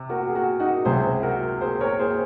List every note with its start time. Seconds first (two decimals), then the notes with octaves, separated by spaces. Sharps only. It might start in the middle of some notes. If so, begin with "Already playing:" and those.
Already playing: C3
0.09 F#4 A#4
0.21 F#4
0.28 G#4
0.35 F#4 A#4
0.60 D#4 F#4
0.85 C#2 C3 F#3 G#4 C5
1.23 F#4 A#4
1.61 G#4 C5
1.81 A#4 C#5
1.99 G#4 C5